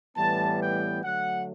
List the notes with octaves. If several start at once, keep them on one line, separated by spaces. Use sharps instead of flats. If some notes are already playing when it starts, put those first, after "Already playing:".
A2 E3 G3 B3 A5
G5
D3 F#3 A3 F#5